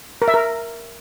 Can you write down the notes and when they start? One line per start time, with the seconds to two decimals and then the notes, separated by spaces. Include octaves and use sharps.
0.22 A#4
0.28 E5
0.34 A#4